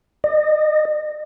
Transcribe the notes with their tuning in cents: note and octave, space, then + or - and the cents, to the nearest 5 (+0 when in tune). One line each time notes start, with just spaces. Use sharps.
D#5 -35